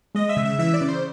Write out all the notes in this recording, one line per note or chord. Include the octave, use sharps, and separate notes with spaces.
G#3 D#5
E5
C#3
E5
E3 E5
D5
C#3
C5